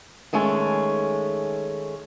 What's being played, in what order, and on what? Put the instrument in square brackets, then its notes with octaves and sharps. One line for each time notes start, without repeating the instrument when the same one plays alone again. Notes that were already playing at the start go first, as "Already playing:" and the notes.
[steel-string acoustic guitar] D#3 G#3 A3 C#4 A4